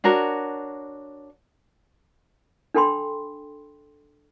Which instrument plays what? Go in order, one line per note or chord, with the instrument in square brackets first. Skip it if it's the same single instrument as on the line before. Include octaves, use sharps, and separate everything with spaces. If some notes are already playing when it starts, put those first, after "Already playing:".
[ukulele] D4 F#4 A#4 C#5
[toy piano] D4 A4 G5 B5 C6